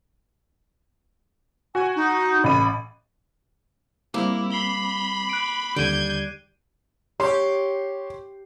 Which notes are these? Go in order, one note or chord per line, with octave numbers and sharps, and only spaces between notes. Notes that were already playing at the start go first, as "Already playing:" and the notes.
F#4 G#5
D#4
A1 B5 D#7
G3 A#3 C4 E4 D6
B5 C7 G7
F#6 D7
D#2 D3 G3 G6 G#6 D7 D#7
G4 C#5 C6